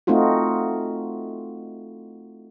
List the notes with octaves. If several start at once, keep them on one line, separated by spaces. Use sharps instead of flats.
A3 C4 D#4 F4 F#4